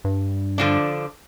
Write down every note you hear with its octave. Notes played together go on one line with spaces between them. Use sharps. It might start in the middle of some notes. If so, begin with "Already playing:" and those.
G2
D3 F3 D4